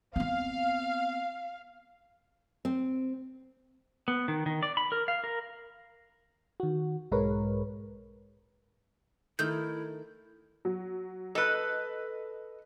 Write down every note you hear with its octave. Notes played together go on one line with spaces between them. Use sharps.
B3 C4 F5
C4
B3
D#3
D#3
D5
B5
A#4
F5
A#4
D#3 F#4
B1 G#2 G#3 A#4 B4 C#5
D#3 A3 E4 G6
F#3
A4 B4 D#5